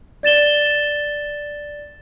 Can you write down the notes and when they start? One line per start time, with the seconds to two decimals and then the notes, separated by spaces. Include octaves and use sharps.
0.23 D5 A6 E7 G7